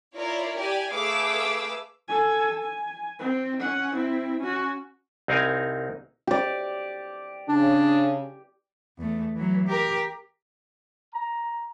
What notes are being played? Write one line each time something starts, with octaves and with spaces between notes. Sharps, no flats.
E4 F4 A#4 C#5 D5
G4 D5 G#5
A3 G#4 B4 F5 D6 E6
A4 G#5
G#5
C4
C#4 F#5
C4 E4
C#4 F#4
C2 C4 D#4 A#4 F5 G#5
G4 D5
C#3 D4
E2 A3
E3 F#3
G4 A#4
A#5